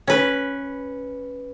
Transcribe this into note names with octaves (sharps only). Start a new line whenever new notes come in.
C#4 B4